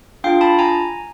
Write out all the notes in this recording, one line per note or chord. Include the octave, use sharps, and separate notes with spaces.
D4 F4 G#4 F5 G5
A5 B5
G#5 A#5